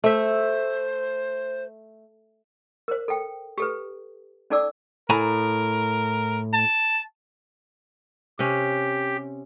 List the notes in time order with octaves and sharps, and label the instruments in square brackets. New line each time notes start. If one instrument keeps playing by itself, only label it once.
[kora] A3 E5 [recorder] C5
[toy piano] A#4 C5
A4 G5
G4 A4 B4
C#4 D#4 A4 D5 D6 E6
[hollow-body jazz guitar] A2 G#5 A#5 [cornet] A#4
[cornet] A5
[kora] C3 C#4 [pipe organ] G4